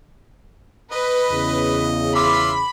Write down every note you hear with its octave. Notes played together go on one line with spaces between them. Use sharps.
B4 D#5
E2 C#3
F4 E5 B5 C6 D6